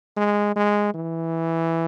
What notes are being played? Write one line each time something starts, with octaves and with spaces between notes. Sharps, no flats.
G#3
G#3
E3